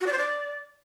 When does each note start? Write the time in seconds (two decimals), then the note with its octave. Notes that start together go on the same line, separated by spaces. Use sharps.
0.01 F#4
0.07 D5
0.12 C5
0.18 D5